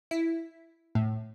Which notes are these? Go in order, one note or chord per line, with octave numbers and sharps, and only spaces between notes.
E4
A2